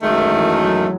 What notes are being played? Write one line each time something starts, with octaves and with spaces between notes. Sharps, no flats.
F#2 D#3 G#3 A3
E3
F#3